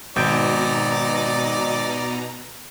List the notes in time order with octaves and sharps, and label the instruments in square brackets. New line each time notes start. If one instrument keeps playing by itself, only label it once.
[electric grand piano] G#1 G6 D7 [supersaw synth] B2 A#5 [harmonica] D#4 D5